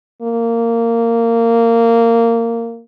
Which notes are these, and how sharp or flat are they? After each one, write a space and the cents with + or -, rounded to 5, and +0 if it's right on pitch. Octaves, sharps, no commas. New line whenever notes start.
A#3 -15